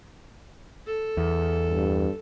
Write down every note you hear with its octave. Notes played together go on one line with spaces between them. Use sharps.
A4
E2
G2